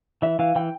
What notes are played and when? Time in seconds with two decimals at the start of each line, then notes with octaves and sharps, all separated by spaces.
0.22 E3 E5
0.39 E3 F5
0.56 E3 G5